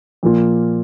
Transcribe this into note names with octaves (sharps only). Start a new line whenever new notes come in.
A#2 F3 A#3 F4